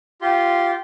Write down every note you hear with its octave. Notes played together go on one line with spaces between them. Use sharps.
F4 G4 C6